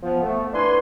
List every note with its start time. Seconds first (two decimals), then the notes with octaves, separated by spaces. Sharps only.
0.03 F3 B3
0.23 A3
0.53 D4 E4 B4 G#5 C6